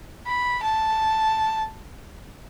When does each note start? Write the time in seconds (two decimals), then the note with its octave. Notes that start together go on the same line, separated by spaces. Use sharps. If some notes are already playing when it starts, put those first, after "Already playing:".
0.27 B5
0.63 A5